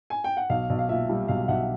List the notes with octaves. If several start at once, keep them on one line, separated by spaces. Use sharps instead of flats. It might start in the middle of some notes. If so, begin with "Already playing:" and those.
G#5
G5
F#5
B1 F5
B1
F5
A#2 E5
G3
B1 F5
B1 E5 F#5